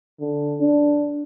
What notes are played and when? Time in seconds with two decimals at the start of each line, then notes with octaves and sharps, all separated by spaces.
0.21 D3
0.60 D4